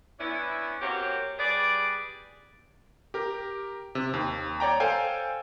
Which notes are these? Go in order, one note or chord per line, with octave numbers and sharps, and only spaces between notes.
B3 C#4 D4 E4
A#3 C4 F#4 G4 A#4 C#5
G3 G#4 B4 D5
G4 A#4
C3
D#2
C#5 D5 G5 A#5
A4 C5 F5 G5 G#5